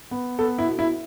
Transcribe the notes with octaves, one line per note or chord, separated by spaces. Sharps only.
B3
B3 A4
E4
B2
E4